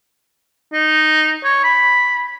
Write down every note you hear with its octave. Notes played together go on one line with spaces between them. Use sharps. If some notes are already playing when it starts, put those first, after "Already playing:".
D#4
C#5
B5